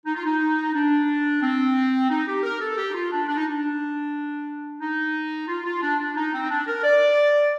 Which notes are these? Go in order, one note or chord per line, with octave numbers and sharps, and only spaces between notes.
D#4
F4
D#4
D4
C4
D#4
G4
A#4
A4
G4
D#4
F4
D4
D4
D#4
D4
D#4
F4
F4
D4
D4
D#4
C4
D#4
D4
A#4
D5